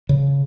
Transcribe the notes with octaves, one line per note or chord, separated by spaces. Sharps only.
C#3